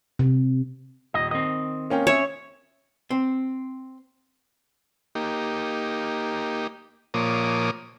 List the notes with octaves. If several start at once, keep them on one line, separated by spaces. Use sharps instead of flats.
C3
D#1 D#5
D#3 C4 D#5
A#3 C#4 G5
C#4 C#5 E5 E7
C4
A#3 D#4 G4
A#2 F3 A#3 C#5 D6 D#6